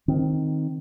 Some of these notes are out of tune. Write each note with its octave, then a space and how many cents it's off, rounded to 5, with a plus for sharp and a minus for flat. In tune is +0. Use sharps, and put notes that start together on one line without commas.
D#3 +0 C4 +0